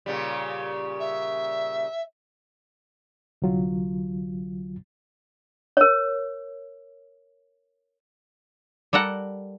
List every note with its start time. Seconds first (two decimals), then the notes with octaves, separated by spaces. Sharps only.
0.06 A#2 C#3 G3
0.99 E5
3.42 C2 D3 F#3 F4
5.77 A#4 C#5
8.93 G3 A4 A#4 F#5